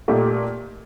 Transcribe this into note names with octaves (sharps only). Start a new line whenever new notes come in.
A#2 A3 D#4 G4